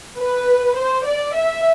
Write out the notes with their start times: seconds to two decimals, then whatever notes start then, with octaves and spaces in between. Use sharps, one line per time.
0.19 B4
0.78 C5
1.06 D5
1.35 E5